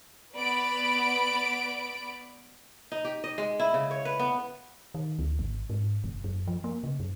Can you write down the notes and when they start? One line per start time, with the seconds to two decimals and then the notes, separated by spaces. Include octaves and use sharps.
0.35 B3 D5 B5 D7
2.92 D#4
3.05 G4
3.24 D#5
3.38 G#3
3.60 E4
3.74 C#3
3.91 C#5
4.05 B4
4.19 B3
4.94 D#3
5.19 D2
5.39 G#1
5.70 G#2
6.04 F#1
6.24 F#2
6.48 F3
6.64 A#3
6.83 C#3
7.00 F#2